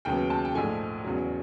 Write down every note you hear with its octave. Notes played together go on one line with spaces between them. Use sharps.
D#2 C#3 F#3 B3 G5
A5
G5
A#1 G#2 F3 A3 G#5
E2 C#3 F#3